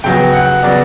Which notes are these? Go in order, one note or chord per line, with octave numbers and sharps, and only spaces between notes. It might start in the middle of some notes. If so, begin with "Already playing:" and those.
C#3 F#3 B3 G5
F#5
C#3 F#3 B3 D5